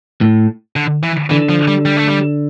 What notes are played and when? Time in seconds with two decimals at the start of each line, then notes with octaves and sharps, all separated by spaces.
0.21 A2
0.76 D3
1.03 E3
1.30 D3 E3
1.49 F3
1.68 G3
1.86 G3
1.97 A3
2.08 G3